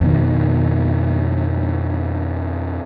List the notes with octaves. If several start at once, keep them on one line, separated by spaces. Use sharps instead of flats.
F2 B2 D#3